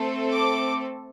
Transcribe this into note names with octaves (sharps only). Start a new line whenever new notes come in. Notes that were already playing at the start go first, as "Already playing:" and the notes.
Already playing: A3 C4 A4
D6